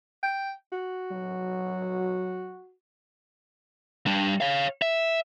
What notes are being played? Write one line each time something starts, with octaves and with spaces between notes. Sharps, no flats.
G5
F#4
F#3
G3 D4
C#5 F5
E5